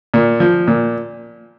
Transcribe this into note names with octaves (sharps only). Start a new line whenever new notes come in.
A#2
F3
A#2